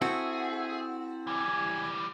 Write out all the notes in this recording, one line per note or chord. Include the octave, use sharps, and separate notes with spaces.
C4 E4 F#4 G#4 A4 E5
E3 G3 G#5